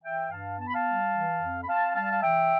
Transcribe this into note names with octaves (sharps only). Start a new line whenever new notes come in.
E3 E5 G5
G2 F5 A5
B3 A5
B5
F5 A5
G3
E3
F2
B5
C4 F5 A5
G3 F5 A5
F5
E3 E5 G5